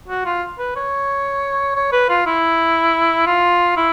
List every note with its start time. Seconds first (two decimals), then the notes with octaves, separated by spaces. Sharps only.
0.08 F#4
0.26 F4
0.59 B4
0.76 C#5
1.76 C#5
1.93 B4
2.09 F4
2.27 E4
3.26 F4
3.77 E4